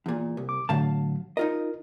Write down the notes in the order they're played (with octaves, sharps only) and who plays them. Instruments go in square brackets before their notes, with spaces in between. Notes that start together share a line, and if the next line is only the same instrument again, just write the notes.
[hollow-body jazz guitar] E2 A#2
C2
[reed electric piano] D6
[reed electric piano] A2 D3 [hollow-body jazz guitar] F#3 F5 A5
[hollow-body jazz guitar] D#4 F4 D#5 [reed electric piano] A#4